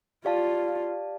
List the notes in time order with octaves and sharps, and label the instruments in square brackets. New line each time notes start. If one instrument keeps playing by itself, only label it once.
[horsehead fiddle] F4 [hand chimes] G4 D5 F5 A5